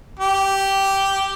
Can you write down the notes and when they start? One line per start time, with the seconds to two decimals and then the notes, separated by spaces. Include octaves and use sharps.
0.19 G4